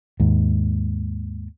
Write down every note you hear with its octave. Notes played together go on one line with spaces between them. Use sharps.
D#2 G#2